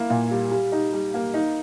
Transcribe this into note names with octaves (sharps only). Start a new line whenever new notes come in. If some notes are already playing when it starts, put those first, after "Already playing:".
Already playing: A#3 E4
A#2
G3
G3
D#4
G3
A#3
D#4